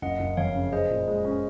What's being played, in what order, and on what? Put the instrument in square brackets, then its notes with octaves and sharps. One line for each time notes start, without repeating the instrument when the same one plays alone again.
[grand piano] F#1 [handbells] D#5 F#5
[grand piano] F#1
[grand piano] F2 [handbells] C#5 F5
[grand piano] C#3
[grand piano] G#4 [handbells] C5 D#5
[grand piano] A#2
G#3
C#4